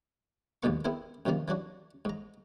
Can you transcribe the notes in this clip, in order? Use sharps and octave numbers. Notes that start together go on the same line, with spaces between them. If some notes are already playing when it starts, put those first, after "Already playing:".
A#1 D#2 G#2 B2 A#3 C#6
B3 C4 E4 G#4 A#4
F#2 C3 D#3 F3 A#3
E3 F#3 D4 F#4
G#2 A#5